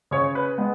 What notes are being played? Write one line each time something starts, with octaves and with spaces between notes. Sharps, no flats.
C#3 C#5
B4
G#3 B3